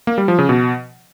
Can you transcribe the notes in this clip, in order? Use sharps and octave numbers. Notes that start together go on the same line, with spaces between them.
A#3
G3
F3
C#3
B2